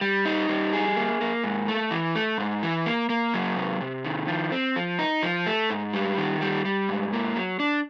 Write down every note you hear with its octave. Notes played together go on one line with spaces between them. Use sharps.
G3
D#4
G3
G#4
A#3
A#3
G#2
A3
E3
A3
G#2
E3
A#3
A#3
F#3
C3
C3
D#3
F3
C4
F3
D#4
F3
A3
G#2
G3
D#3
G3
G3
G#2
A#3
F#3
D4